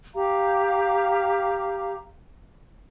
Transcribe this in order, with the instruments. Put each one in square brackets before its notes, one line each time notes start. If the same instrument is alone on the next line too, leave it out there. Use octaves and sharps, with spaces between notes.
[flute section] G4 F5 A#5